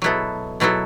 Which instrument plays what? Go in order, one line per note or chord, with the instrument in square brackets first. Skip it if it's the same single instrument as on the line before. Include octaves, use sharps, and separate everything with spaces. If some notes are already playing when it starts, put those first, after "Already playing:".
[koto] B2 F#3 B3 E4 A4
B2 F#3 B3 E4 A4